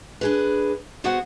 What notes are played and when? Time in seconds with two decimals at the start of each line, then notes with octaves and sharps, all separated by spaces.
0.21 D4 G#4 B4
1.04 B3 F#4 G#4 C5 F#5